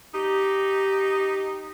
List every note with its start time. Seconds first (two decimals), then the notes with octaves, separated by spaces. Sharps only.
0.13 D#4 G4